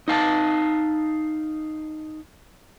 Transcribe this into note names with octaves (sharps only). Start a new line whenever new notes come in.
D#4 F5 G#5 A5